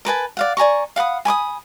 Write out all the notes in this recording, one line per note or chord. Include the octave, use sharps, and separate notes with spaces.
A#4 B4 G#5 A5
D5 F5 F#5
D5 G#5 A#5 C#6
F5 F#5 B5 D#6
G#5 B5 D6 D#6